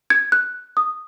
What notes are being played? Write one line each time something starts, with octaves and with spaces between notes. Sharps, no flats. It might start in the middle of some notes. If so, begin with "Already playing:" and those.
G#6
F#6
D#6